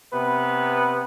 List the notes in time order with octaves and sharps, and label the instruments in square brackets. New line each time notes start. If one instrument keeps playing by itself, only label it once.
[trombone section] C3 B3 B4